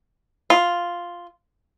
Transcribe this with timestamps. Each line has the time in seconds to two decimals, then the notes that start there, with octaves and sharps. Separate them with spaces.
0.50 F4